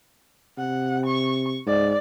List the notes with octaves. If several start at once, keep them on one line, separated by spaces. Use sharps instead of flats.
C3 F#5
C#6
G#2 D5